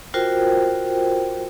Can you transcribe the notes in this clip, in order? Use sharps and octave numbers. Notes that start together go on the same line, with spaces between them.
F4 F#4 A#4 C5 G5